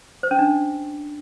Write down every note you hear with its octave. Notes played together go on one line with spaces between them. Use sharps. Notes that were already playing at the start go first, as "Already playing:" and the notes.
C5
C#4
D4